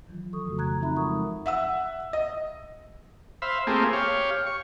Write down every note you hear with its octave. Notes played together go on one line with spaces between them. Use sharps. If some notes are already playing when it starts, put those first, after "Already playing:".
D#3 E3 F#3 F4
F3 A4 C#6 D#6
F2 C#3 A3 F#4
A#5 F#6 G#6
C4 D#4 F4 E5 A#5 B5
F3 G#3 A#4 F#5 C#6 D#6
E5 F#5 E6
D#5
C5 E5 F5 B5
A3 A#3 C4 F4 G4 G#4
G4 C#5 F5
C#6